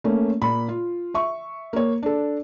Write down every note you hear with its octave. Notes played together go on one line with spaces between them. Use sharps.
A3 A#3 C#4
A#2 B5
F4
E5 C#6
A#3 C#5
D4 A4